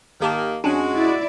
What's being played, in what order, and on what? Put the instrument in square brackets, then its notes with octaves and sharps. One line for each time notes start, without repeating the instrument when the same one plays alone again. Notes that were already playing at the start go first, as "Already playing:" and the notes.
[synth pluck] G#1 G4 A5 [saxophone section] D#3 A#3
[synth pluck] F2 C#4 D4 [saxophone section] G#3 F#4
[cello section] E4 D5